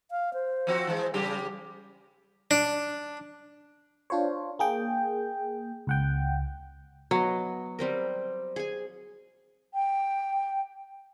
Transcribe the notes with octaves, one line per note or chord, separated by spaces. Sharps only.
F5
C5
F3 C4 F#4
E3 G#3
C#3 G3 G4 G#4
D4
D4 F4 C5 C#5
A#3 G#4 G5
C#2 F#5 G5
F#3 B3 D#5
G3 C4 A#4
G#4 G#5
G5